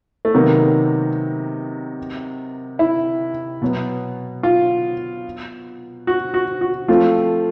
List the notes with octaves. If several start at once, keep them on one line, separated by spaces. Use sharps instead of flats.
A3
C3 D#3 F#3 A#3 B3 D#4
E4
B2 F#3 B3
F4
F#4
F#4
F#4
F3 A3 C4 F4